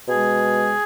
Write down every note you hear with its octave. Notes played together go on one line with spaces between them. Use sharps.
B2 G#3 G#4